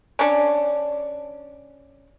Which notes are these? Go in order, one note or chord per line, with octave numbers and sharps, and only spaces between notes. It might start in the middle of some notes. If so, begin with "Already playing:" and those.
C#4 D4